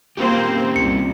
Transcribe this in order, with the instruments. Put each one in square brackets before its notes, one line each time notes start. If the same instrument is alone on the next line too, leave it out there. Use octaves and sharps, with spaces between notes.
[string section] A#3 C4 C5 [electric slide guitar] C#4 F4 G4
[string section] C2 [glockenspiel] C#7